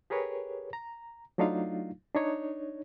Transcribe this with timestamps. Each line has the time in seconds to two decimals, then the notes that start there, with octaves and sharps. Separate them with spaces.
0.10 G4 G#4 A#4 B4 C#5
0.73 A#5
1.38 F#3 A3 D4 D#4 F4 F5
2.15 D4 D#4 C#5